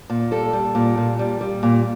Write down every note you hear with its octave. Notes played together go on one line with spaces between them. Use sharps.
A#2
G3 A4
G3
A#2
A#2
G3
G3
A#2